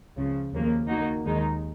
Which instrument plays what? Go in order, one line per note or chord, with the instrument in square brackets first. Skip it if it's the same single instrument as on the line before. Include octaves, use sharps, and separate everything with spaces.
[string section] C#2 C#3 F3
D#2 C#3 F3 A#3
D#3 A#3 D#4 F#4
D#2 D#3 G#3 D#4